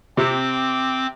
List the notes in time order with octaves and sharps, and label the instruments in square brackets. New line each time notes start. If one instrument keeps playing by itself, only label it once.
[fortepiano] C3 [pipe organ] C4 D6